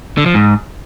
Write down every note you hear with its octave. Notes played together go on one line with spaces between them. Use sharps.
D3
F3
G#2